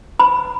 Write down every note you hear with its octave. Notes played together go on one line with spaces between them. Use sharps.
B5